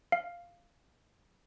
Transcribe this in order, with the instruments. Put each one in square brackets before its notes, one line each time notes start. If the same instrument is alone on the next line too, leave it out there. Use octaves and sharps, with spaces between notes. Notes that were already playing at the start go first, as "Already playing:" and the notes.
[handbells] F5